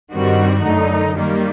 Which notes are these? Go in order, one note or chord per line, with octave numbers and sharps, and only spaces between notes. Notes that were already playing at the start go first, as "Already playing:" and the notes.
G2 D#3 G3 C4 F#4
F#2 D3 A3 D#4
D#3 G3 A#3